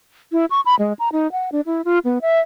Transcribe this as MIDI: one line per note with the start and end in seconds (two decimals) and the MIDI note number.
0.32 0.45 64
0.51 0.60 85
0.66 0.75 83
0.79 0.93 56
0.99 1.09 82
1.12 1.30 63
1.32 1.50 78
1.52 1.61 62
1.66 1.84 64
1.85 1.99 65
2.05 2.18 59
2.22 2.40 76